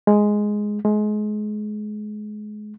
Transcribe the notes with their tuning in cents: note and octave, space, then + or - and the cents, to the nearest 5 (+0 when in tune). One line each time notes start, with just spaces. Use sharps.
G#3 +0
G#3 +25